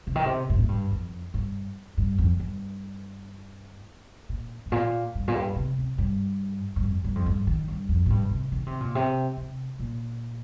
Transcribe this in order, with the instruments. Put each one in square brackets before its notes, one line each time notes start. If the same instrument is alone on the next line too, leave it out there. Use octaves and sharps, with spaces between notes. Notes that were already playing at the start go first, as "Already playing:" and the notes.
[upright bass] C3
D#3
C3
G2
A#2
G2
F2
G2
G2
F2
G2
A#2
G2
A#2
G2
A#2
G2
C3
C3
G2
G2
F2
G2
F2
G2
D#3
G2
F2
A#2
G2
C3
D#3
C3
A#2
C3
C3
A#2